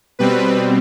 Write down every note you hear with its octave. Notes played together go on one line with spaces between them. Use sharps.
B2 G3 C4 B4